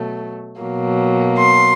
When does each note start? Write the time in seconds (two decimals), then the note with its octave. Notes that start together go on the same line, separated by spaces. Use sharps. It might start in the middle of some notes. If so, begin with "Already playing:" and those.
Already playing: B2 F#3 A3
0.61 B2 F#3 A#3
1.38 C6